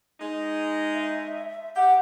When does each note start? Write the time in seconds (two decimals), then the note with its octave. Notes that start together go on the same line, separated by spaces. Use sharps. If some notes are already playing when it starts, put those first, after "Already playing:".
0.20 G#3 D#4
0.94 E5
1.75 G4 F#5